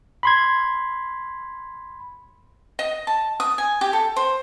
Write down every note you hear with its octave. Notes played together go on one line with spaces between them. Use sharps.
B5 C6 G#6
D#5
A5
D#6
G#5
G4
A4
C5